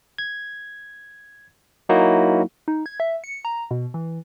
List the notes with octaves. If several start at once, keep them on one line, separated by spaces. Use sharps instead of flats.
G#6
F#3 A#3 D#4 E4 F#4
D#4
G#6
E5
C#7
A#5
B2
E3